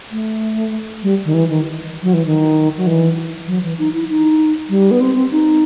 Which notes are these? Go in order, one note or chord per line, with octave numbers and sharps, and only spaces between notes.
A3
G3
D#3
E3
D#3
F#3
E3
D#3
F#3
E3
F#3
E3
D#4
E4
D#4
G3
B3
C4
C4
D#4